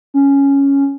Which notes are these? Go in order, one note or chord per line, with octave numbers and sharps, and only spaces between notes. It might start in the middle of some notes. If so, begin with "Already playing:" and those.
C#4